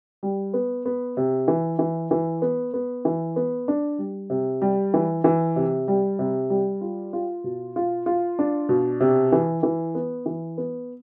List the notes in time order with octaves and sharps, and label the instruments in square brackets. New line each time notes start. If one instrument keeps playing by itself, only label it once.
[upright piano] G3
B3
B3
C3
E3
E3
E3
B3
B3
E3
B3
D4
G3
C3
G3
E3
E3
C3
G3
C3
G3
F4
F4
B2
F4
F4
D4
B2
C3
E3
E3
B3
E3
B3